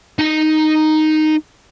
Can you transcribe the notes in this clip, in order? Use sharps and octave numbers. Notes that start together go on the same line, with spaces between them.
D#4 A#5